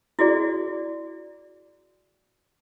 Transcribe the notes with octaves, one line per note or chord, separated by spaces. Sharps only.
E4 F#4 G#4 D5